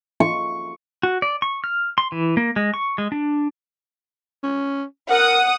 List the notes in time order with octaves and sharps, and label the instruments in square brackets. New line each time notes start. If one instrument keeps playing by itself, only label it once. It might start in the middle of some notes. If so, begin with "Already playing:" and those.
[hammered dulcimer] C#6
[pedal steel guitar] F#4
D5
C#6
F6
C6
E3
A#3
G#3
C#6
G#3
D4
[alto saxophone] C#4
[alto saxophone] A#4 [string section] F#5 D#6